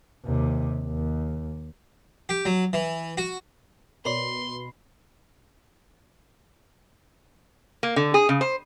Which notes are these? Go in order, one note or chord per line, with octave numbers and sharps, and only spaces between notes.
D#2 C3
D#2
G4
F#3
E3
F#4
B2 A#4 C#5 D5 B5 C6 C7
A#3
D3
G#4
C#3
C5